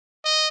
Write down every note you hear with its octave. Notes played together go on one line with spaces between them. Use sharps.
D#5